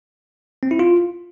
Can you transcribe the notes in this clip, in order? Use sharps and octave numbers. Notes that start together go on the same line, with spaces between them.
C4
E4
F4